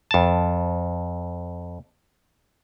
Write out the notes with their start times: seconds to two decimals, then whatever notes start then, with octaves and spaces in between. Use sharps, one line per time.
0.11 F2 A5